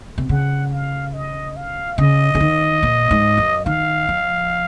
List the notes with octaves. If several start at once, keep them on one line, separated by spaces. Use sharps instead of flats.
C3
C#3 F#5
F5
D#5
F5
C#3 D#5
C#3
D#3
A#2
G#2
F#2
D#3 F5
F3